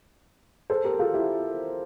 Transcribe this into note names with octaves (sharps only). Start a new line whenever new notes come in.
A4 C5
G4 A#4
F4 A4
E4 G4